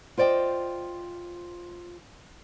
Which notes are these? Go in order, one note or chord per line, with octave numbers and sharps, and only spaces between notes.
F4 C5 D5 D#5 G5